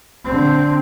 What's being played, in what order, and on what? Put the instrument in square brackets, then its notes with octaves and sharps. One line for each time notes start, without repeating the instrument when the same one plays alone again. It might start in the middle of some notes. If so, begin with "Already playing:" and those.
[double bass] D3 C4